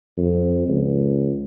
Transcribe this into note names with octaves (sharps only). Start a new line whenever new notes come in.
F2
C#2